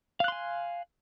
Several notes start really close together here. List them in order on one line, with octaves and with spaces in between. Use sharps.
F5 F#6 C6 G#5